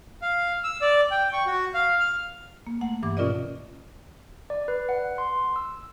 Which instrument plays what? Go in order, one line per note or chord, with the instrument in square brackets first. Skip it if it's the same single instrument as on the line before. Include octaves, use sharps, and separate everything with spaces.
[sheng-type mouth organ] F5
E6
D5
G5
C#6
F#4
F5
F6
[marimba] A#3
A3 F#5
G2 E3 D6
B2 C#4 F4 A#4 D5 D#5
[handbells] D5
B4
F#5
C6
E6